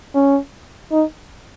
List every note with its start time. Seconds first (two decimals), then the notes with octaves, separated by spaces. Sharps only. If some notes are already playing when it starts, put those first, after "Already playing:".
0.14 C#4
0.92 D#4